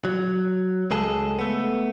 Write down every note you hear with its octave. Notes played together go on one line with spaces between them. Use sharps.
F#3
C#2 G#3 G#4 A4
A3 B3